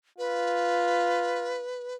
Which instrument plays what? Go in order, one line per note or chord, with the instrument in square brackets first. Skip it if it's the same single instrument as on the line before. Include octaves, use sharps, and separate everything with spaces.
[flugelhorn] F4 [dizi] B4